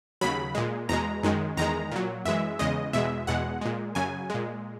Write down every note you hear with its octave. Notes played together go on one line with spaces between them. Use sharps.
D#2 C#3 F#3 B5
A#2 G#3
E2 B2 G#3 A#5
F#2 D#3 G#3
E2 D#3 G#3 A#5
A#2 F#3
F#2 E3 G#3 E5
E2 C#3 G#3 D#5
E2 B2 G#3 E5
E2 B2 G#3 F#5
A#2 G#3
F#2 C#3 F#3 G#5
A#2 G#3